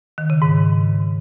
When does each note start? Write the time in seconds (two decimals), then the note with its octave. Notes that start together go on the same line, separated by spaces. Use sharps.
0.18 D#3
0.30 C#3
0.42 G#2